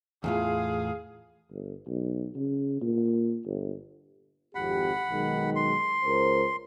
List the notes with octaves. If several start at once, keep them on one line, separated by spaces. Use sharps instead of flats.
E2 A2 F4 G#4 F5
G1
B1
C#3
A#2
G1
G#1 F2 G4 F#5 B5
B1 D#3 G#3
C6
C#2 A#4 C5